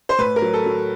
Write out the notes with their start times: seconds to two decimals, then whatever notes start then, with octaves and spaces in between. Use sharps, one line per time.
0.09 C5
0.19 A2 B4
0.36 A#4
0.42 F#3
0.54 A4
0.66 F#3